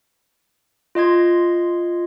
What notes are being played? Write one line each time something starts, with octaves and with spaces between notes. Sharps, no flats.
F4 D#5 C6 G#6